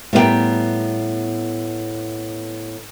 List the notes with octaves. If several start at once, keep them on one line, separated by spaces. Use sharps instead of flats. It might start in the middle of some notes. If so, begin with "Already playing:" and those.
A2 G3 B3 E4 A#4 G5